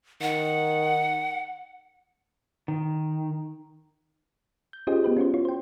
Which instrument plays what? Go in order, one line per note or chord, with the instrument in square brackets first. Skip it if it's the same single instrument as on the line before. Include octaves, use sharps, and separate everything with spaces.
[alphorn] D#3 [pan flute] F#5
[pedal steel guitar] D#3
[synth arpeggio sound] G6
C#4 F4 G4 G#4 C5 D#5
B3 G4 B4
C#4 F4 F#4 C5
E4 F4 C#5
C5 G5